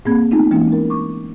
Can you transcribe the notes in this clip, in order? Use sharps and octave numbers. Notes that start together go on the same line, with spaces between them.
A2 A#3 C4 G#4 B5 G#6
A3 B3 C4 D#4 F4
E3 G#3 A#3 C#4 E4
D#4 A#4
C#6 D6